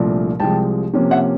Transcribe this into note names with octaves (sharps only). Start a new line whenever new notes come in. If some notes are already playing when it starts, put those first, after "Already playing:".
Already playing: C2 A#2 F3 A3 D4
C2 C3 F3 G#3 G5 A5
C3 F3 A#3 C#4
E5 F#5